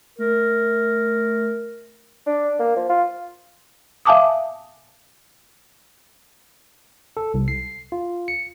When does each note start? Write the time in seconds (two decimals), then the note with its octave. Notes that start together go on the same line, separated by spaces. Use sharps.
0.19 A3 A#4
2.26 D4
2.59 A#3
2.76 F3
2.89 F4
4.05 E5 F5 G#5 A5 D6 D#6
7.17 A4
7.34 C2
7.48 C7
7.92 F4
8.28 C#7